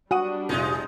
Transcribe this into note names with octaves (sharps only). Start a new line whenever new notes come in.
G3 D4 F#4 F#5 D#6 D#7
F1 A#1 C3 G#3 D#4